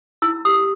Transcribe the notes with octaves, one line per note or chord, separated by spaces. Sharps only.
E4 E6
G4 D#6